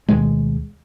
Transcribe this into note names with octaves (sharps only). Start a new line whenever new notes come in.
D2 B2 D#3 G#3